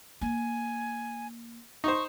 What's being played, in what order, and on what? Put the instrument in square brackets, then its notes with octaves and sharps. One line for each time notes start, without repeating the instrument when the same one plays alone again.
[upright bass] A#3 [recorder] G#5
[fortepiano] D#4 C5 [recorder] C#6